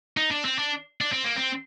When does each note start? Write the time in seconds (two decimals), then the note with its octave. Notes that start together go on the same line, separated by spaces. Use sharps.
0.17 D#4
0.31 D4
0.45 C4
0.59 D4
1.01 D4
1.12 C4
1.24 A#3
1.36 C4